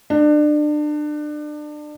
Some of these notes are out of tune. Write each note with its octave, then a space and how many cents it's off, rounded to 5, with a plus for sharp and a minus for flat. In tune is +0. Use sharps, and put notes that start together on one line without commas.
D4 +30